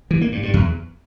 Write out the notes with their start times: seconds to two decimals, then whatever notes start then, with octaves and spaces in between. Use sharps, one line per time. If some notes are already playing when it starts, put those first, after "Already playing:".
0.11 E3
0.21 A#3
0.32 G2
0.43 G2
0.54 E2